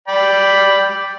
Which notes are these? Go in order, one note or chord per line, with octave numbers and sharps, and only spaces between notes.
D5 G5 B5